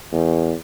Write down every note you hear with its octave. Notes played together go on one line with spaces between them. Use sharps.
E2